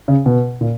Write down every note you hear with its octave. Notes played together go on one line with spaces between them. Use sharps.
C#3
B2
A#2